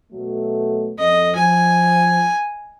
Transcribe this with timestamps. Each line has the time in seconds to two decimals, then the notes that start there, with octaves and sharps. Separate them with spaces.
0.13 B2 F#3 A3
0.98 F2 D#5
1.35 F3 G#5